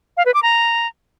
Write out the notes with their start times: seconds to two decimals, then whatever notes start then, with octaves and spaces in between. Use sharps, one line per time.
0.17 F5
0.26 B4
0.34 D6
0.43 A#5